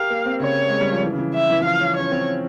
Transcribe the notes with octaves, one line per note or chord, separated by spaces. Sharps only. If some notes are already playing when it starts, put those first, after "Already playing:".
Already playing: G4 A#4 F5
A#3
C4
C#3 C#5
G#3
G3
F3
E3
C#3
E3
E5
E3
E3
F3 F5
C#4
C#4 C#5
C4